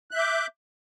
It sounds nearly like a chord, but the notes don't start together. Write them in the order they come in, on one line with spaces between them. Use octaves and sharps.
F#6 E5 G6 D6